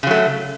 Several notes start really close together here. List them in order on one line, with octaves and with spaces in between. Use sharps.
C#3 F#3 A3